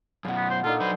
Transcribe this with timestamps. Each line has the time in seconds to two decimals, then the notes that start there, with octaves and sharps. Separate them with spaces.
0.25 F#2 B2 F5 F#5
0.37 B3
0.50 C5
0.64 A#2 D4 D#4 F4 A4
0.81 F#3 B4 C5